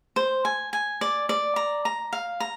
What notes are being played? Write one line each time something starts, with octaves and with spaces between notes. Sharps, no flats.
C5
G#5
G#5
D5
D5
A#5
A#5
F5
A#5